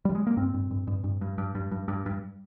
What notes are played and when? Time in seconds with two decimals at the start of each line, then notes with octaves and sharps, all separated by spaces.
0.05 G3
0.15 G#3
0.27 A#3
0.37 G2 C4
0.54 G2
0.71 G2
0.87 G2
1.04 G2
1.21 G2
1.38 G2
1.55 G2
1.71 G2
1.88 G2
2.06 G2